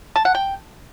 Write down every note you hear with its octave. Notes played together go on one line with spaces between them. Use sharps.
A5
F#5
G5